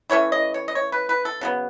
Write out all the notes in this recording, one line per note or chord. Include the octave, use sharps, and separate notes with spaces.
E3 A3 C#4 C#5
D#5
C#5
D#5
C#5
B4
B4
A4
C#3 F#3 B3